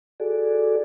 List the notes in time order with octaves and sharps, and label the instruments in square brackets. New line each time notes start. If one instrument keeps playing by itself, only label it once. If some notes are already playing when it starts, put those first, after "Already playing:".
[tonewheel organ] F#4 G#4 A4 D5